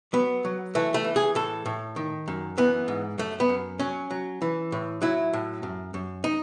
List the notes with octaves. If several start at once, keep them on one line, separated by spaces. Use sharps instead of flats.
F#3 B3
F#3
E3 A3
A3
E3
G#4
A2 A4
A2
D#3
F#2
E3 B3
G#2
F#2 A3
B3
F#2
F#3 C#4
F#3
E3
A2
F#3 E4
A2
F#2
F#2
D#4